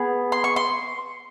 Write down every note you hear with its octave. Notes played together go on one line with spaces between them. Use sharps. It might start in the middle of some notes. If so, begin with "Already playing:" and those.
Already playing: B3 G#4
C6
C#6
C6